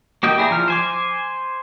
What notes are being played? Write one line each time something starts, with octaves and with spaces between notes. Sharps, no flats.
A#3 F#4 G4 D#5 G5
E4 G#4 D5 A#5
F3 F6
C5 G#5 D6